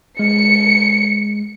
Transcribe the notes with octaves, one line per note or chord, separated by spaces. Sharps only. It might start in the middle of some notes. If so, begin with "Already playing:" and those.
G#3 C#7